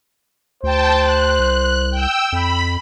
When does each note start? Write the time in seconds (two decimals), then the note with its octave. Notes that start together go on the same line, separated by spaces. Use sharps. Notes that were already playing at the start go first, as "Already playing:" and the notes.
0.63 D2 C5 G5 A5
1.00 F#6
1.40 C2
1.91 G5 E6
2.32 F2 B5